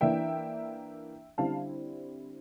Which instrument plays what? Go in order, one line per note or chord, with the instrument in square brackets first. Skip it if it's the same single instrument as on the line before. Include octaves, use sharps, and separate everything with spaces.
[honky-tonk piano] E3 A#3 D4 E5 G5
D3 G3 C4 E4 F5 A5